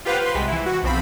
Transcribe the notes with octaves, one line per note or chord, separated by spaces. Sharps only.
F4 G4 B4 C5 F5 F#5
B4 C6
C2 C3 G#3 B6
E3 E4
F#4
B1 F3 C4 B5